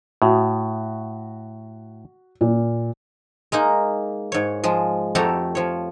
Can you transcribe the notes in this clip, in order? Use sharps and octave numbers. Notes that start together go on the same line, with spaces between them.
A2 F#4
A#2
G#3 A#3 D#4
G#2 C#5
F3 G#3
F2 A3 F#4 G4 A4 A#5
F3 C#5